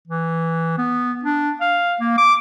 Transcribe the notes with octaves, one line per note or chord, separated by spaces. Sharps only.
E3
B3
D4
F5
A#3
D6